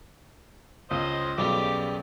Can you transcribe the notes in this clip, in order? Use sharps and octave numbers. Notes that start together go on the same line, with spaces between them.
C#2 C5 D#5
B1 C#3 G3 A3 G4 D6